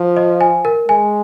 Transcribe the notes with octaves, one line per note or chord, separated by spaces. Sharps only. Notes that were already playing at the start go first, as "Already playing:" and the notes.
Already playing: F3
D#5
G#5
A#4
G#3 G#5